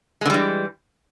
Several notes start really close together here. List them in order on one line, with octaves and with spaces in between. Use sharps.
G#3 D3 G3 E3